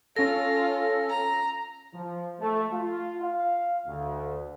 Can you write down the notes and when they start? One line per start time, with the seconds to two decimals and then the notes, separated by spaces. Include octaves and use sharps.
0.16 C#4 F4 A4 A#6
1.10 A#5
1.93 F3
2.40 A3
2.73 F4
3.22 F5
3.86 D2